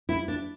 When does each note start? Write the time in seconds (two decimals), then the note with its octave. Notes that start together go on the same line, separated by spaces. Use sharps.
0.09 E4
0.28 D4